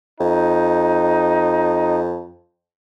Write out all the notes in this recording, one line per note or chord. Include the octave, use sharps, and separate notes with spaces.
F2 D#4